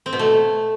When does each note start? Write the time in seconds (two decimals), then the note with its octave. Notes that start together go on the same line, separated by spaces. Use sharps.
0.06 C4
0.13 B2
0.19 A3